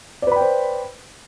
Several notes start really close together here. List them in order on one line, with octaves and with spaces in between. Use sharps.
D5 B4 B5 G5 C5